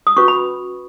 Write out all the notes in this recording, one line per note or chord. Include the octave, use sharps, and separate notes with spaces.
D#6
C#4 F#4 B4 C#6
B5